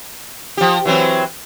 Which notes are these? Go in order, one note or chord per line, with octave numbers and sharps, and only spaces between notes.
F3 G4
E3 F#3 C4